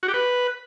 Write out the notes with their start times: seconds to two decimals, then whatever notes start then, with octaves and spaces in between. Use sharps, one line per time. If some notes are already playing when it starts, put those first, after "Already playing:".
0.03 F#4
0.08 G4
0.14 B4